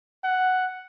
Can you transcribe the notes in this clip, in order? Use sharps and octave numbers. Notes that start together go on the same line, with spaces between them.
F#5